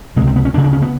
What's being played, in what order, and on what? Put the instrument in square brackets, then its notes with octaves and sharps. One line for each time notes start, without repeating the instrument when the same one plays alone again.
[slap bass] C#2 C3 G#3
C4
B3
C#4
D2 D4
C#3
D4
C#4
B3